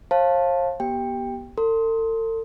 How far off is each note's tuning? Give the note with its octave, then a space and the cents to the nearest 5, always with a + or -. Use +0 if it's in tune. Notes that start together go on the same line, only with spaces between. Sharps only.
C5 +45 F5 +0 A5 +0
B3 -35 G4 -15 G5 +15
A4 +40 C6 +0